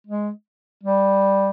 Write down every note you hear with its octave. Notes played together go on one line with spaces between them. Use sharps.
G#3
G3